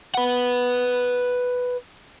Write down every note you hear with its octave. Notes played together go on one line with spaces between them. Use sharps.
B4 F#5